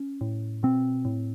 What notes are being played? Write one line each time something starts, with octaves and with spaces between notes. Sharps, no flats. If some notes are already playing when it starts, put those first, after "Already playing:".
Already playing: C#4
A2
B2 C4
A2